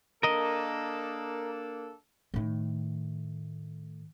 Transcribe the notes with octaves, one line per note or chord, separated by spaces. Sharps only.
A#3 D4 A4 A#4 D#5
A2 D#3